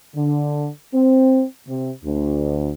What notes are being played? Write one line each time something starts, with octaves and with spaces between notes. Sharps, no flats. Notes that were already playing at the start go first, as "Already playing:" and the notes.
D3
C4
C3
D2